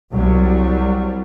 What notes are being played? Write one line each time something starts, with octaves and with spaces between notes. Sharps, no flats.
C2 F#3 G3